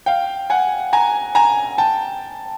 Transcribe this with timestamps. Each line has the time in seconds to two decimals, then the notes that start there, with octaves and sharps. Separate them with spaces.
0.06 F5 G5
0.50 F#5 G#5
0.93 G#5 A#5
1.35 G#5 A#5
1.78 G5 A5